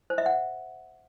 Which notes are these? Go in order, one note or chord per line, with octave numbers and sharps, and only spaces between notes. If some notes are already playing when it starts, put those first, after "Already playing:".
C5
E5
F#5